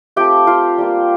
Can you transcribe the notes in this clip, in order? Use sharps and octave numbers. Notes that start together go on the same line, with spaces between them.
A3 C4 F4 G4 G5
F4 F5
G3 A#3 F4